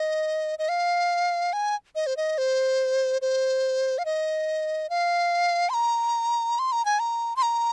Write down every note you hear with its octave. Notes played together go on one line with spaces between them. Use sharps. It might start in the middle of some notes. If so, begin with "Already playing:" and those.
Already playing: D#5
D#5
F5
G#5
D#5
C5
D#5
C5
C5
F5
D#5
F5
C6
A#5
C6
A#5
G#5
A#5
C6
A#5